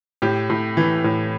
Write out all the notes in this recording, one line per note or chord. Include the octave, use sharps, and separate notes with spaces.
A2 G4
A2
E3
A2